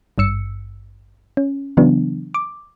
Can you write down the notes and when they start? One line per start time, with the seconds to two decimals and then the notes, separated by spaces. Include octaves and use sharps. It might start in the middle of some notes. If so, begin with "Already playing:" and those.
0.18 G#1 G2 E6 C#7
1.37 C#4
1.77 C#3 E3 F#3 B3 D4
2.34 D6